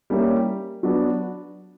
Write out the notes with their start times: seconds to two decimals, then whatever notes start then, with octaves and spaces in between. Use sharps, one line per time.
0.10 G3 A#3 C#4 E4 G4
0.83 F#3 B3 D4 F#4